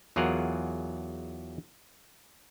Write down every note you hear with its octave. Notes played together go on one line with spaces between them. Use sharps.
E2 F#3 F4 G#4 A#4 F#5